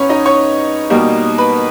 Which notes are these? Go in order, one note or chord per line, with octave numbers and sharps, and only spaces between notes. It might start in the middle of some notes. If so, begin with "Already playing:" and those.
Already playing: G#2 C#4 B4 C#5
D#4 D#5
C#5 C#6
B2 G3 A#3 D#4
B4 B5